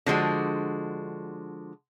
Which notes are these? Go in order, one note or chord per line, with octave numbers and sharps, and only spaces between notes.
D3 F3 G#3 F#4